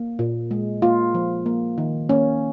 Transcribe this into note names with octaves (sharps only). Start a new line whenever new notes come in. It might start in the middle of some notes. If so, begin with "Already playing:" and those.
Already playing: A#3
A#2
G#3
A#3 F4
F3
A#3
D#3
A#3 C#4